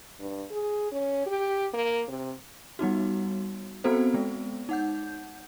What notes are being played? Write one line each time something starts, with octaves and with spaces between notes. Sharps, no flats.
G2
G#4
C#4
G4
A#3
C3
G3 B3 D#4 F#4
B3 C4 F#4 A4 C5
G#3 B3
D#4 F#5 G6